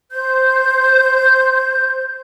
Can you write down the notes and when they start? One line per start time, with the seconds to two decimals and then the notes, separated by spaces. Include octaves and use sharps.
0.11 C5 G6